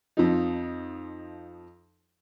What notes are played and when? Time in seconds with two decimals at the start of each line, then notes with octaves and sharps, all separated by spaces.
0.17 F2 F3 D#4